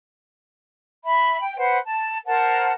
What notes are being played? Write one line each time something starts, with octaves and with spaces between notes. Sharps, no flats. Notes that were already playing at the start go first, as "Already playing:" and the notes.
E5 B5
G5
B4 C5 F#5
A5
A#4 C5 F#5 A5